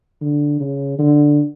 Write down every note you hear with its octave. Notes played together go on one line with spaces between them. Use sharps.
D3
C#3
D3